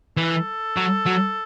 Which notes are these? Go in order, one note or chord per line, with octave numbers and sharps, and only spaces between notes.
E3 A4
B4
A4
F#3
F#3